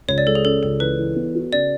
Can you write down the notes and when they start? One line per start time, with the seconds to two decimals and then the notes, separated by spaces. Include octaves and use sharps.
0.08 C#2 C#5
0.18 D5
0.26 G#3 A4
0.35 G#4
0.45 C#4 A4
0.63 C#2 A4
0.80 E3 B4
0.99 E3
1.16 B3
1.35 F#4
1.53 C#3 D5